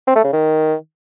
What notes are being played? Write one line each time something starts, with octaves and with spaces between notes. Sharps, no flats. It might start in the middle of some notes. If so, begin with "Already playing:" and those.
C4
A3
C#3
D#3